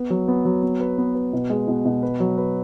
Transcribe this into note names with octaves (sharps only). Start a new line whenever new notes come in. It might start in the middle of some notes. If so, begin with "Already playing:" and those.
Already playing: B3 B4
F#3
B3
F#3
B3
B4
B3
B4
B2
G#3
B2
B2
B4
F#3
B4